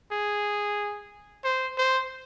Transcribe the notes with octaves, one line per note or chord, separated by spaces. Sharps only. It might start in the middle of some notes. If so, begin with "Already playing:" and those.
G#4
C5
C5